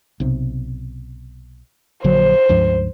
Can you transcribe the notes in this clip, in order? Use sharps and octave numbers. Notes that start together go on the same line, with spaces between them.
B1 C3
A#1 D3 F#3 C5
C#2 G2 F3